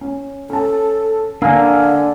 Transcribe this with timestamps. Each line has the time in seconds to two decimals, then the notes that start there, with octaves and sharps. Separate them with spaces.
0.01 C#4
0.50 C#4 A4 A5
1.42 D3 A#3 D4 G#5 E6 F6